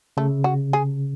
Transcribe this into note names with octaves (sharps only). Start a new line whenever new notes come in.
C#3 A3
F#4
G#4